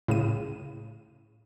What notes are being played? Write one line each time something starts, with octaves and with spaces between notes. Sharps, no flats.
A2 C#3 D#7